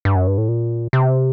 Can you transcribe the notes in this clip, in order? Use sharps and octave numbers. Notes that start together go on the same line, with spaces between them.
G2
F#2
G2
A2
A#2
C3